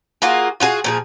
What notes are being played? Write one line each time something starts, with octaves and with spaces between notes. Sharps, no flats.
A#3 F4 F#4 G#4
F4 F#4 G#4
A#2 F3 G#4